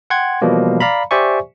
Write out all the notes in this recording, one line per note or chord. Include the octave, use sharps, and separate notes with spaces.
F#5 G5 C6 G#6
B2 E3 F3 G3 A#3
D5 F5 A#5 B5
G4 C5 D5 E5 G#5 C#6